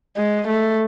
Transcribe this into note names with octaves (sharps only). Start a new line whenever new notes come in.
G#3
A3